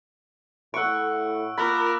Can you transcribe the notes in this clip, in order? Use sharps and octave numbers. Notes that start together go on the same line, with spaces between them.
A2 F#5 C#6 E6 D7
A#3 F4 A#4 B5 D6 F#6 A6